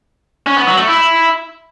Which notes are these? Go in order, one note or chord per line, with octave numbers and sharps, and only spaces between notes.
C#4
B3
F#3
A3
E4